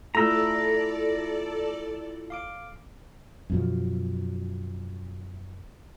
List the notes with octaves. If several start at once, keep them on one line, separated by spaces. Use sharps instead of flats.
A3 E4 F4 A4 D5 A#5 C6 E6
F5 D6 D7
F#2 B2 F3